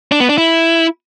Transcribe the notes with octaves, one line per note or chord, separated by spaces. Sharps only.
D4
B3
D4
E4